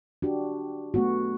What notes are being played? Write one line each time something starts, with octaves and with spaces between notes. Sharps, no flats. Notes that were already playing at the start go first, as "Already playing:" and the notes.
D4 F#4 G4
A3 B3 F#4